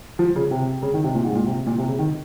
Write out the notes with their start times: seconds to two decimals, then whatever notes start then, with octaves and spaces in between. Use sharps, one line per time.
0.19 F3
0.36 C#3
0.51 C3
0.82 C#3
0.94 D#3
1.04 C3
1.15 A#2
1.24 G#2
1.35 A#2
1.46 C3
1.67 A#2
1.78 C3
1.88 C#3
1.99 D#3